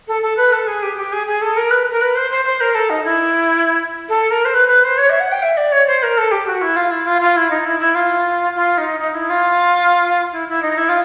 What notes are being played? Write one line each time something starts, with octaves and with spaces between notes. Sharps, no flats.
A4
A4
B4
A4
G#4
G4
G4
G#4
G#4
A4
A#4
B4
A#4
B4
C5
C5
C5
A#4
A4
D#4
E4
A4
A#4
C5
B4
B4
C5
C#5
E5
F#5
G5
E5
D5
C#5
C5
A#4
A4
G4
F#4
E4
F4
E4
F4
F4
E4
D#4
E4
E4
F4
F4
D#4
D#4
E4
F4
E4
E4
D#4
E4
F4